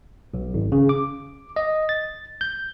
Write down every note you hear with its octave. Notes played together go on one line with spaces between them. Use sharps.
B1
G#1
C#3
D6
D#5
A6
G6